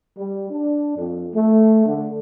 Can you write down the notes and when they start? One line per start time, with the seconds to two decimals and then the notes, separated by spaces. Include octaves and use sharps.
0.18 G3
0.51 D4
0.97 F2
1.35 A3
1.86 D3